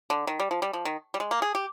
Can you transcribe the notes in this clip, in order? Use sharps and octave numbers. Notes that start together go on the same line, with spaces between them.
D3
D#3
G3
F3
G3
F3
D#3
G3
G#3
A#3
G#4
G4